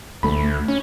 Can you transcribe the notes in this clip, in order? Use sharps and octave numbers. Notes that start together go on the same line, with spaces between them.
D2 A3 B5
C#4